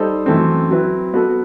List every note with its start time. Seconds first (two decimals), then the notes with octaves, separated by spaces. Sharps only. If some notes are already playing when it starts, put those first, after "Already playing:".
Already playing: G3 D#4 A4 C5
0.26 F#2 E3 A3 C4
0.70 F#3 C4 E4 B4
1.14 F#3 B3 F#4 A4